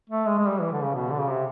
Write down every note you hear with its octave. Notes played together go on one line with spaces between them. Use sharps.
A3
G#3
G#3
G3
E3
D3
C#3
B2
D3
C#3
C3